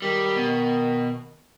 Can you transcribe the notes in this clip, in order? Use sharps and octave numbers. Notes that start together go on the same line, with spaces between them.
D#3 G3
B2